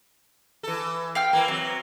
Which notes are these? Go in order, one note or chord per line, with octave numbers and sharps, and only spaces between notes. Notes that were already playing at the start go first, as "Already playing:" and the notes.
E3 A4
F5 G5 F6
E3 A#3
F#3 C4